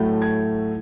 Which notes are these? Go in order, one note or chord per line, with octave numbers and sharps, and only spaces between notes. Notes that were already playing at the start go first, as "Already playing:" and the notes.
Already playing: A2 F#3 A3
G#6